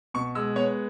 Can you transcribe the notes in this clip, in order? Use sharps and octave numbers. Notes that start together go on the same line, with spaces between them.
B2 C#6
G#3 E6
B3 C#5